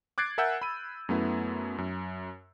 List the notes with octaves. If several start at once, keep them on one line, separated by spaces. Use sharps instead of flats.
D6 F#6 G#6 A6 C7 D7
A#4 E5 F#5 G#5 E6 G6
B5 D#7
F#2 A3 B3 E4
F#2